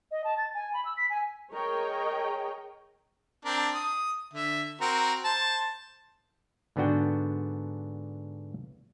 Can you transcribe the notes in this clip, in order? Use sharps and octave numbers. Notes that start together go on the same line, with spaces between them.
D#5
A5
A6
G#5
B5
E6
B6
G#5
G#4 A#4 C#5 D#5 G5
C4 D4 A#4
D#6
D3 E5
C4 F#4 A#4
C5 A5
G#2 D3 B3 D4 F#4 G5